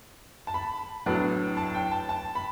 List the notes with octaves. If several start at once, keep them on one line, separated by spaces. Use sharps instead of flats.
A5
B5
A2 F#3 B3 D4
A5
G5
A5
A5
B5